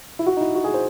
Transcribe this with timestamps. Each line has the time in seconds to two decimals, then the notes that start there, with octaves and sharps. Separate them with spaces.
0.19 E4
0.26 F#4
0.37 D#4
0.41 E4
0.55 F#4
0.64 G#4
0.74 C5